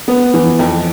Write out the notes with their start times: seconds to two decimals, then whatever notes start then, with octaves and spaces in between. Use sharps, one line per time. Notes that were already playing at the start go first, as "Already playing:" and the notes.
0.08 B3
0.34 E3
0.59 F2